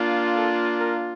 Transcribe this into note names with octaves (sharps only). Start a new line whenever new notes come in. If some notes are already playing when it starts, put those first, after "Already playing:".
Already playing: A#3 D4 F4
A4
A#4